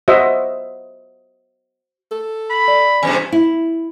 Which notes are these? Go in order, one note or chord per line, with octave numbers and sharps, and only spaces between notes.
F#4 C5 D#5 E5
A4
B5
D5
E2 G2 C3 C#4 G#5
E4